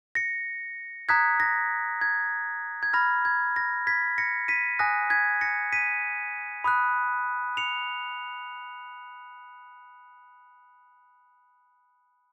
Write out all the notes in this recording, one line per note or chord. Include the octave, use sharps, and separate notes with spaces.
A#6 C#7
A#5 D#6 F#6 G#6 B6
A#6
G#6
G#6
B5 F6 A#6
G#6
A#6
G#6 B6
A#6 C#7
B6 D#7
G#5 D#6 F#6 A#6
G#6 B6
A#6 C#7
B6 D#7
B5 D#6 F#6
C#7 F7